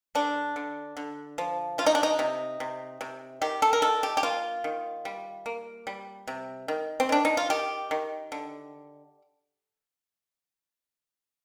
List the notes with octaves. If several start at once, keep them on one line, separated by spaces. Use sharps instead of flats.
D3 D4
D3
D3
F3
C3 F4
D#4
D4
D#4
C3
C3
C3
D#3 G4
A4
A#4
D#3 A4
G4
G4
A#3 F4
D#3
G3
A#3
G3
C3
D#3
C4
D#3 D4
D#4
F4
D#3 G4
D#3
D3